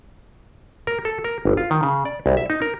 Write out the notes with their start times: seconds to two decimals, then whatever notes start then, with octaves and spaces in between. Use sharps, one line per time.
0.87 A#4
1.05 A4
1.24 A#4
1.45 G1
1.57 F4
1.71 D#3
1.83 C#3
2.05 D5
2.26 C2
2.37 E5
2.50 D#4
2.62 A#4